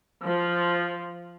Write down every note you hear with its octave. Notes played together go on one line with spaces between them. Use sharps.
F3